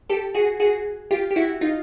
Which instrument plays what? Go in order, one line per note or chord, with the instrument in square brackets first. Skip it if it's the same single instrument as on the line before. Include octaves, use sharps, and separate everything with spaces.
[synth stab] G4 A4
F#4 G#4
F#4 G#4
F4 G4
G4
E4 F#4
D#4 F4